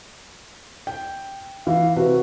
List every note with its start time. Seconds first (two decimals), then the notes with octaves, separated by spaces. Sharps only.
0.87 G5
1.67 E3 F5
1.96 C3 F#4 B4